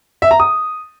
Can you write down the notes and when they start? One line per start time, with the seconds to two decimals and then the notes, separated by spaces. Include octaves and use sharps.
0.22 E5
0.31 A#5
0.40 D#6